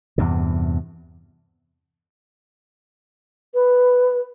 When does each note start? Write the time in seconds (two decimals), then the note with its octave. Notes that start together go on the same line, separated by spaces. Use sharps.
0.18 E2 G2 C3
3.54 B4